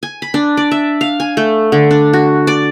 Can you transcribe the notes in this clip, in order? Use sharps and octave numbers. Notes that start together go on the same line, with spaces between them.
G#5
B5
D4
D5
E5
F5
G#5
A3
D3
D4
F#4
D5